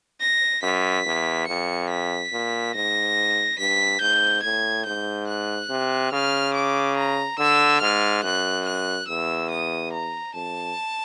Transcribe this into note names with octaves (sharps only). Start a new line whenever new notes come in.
A#6
F#2 B6
E2
F2 C#7
B6
A#2
G#2 A#6
G2 B6
G#2 G6
A2 G#6
G#2 G6
F#6
C3
C#3 F6
D6
A#5
D3 E6
G#2 F6
F#2 F#6
F#6
E2 E6
D#6
A#5
F2 A5